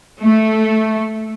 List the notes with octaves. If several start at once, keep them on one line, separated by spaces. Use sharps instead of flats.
A3